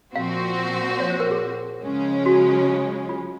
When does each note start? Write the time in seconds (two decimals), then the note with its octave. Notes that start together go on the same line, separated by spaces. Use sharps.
0.15 A#2 F3 C4 F#4 F5
1.00 C#5
1.10 C5
1.20 A#4
1.31 G#4
1.83 C#3 F3 G#3 C#4
2.26 F#4
3.09 F4